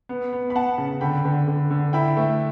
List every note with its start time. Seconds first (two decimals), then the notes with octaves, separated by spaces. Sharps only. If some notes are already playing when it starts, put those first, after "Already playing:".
0.09 B3
0.33 B3
0.50 B5
0.55 B3 F#5 A5
0.78 C#3
1.01 D3 G5 B5
1.25 D3
1.48 D3
1.70 D3
1.93 E4 G5 B5
2.17 A3